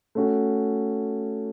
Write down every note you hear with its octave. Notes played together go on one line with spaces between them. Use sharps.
A3 C#4 F#4